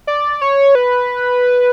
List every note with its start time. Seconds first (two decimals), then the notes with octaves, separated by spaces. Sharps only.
0.07 D5
0.41 C#5
0.75 B4